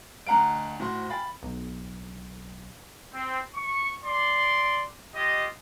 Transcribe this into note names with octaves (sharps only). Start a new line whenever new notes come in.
D2 D#5 F5 F#5 A#5 D7
A2 F#4 C5 C6
F5 G5 G#5 B5 A6
B1
C4
C#6
D5 C6
F4 G4 D#5